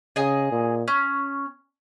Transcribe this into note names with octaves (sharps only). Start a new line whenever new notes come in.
C#3 G#4 D#5 G#5
A#2
C#4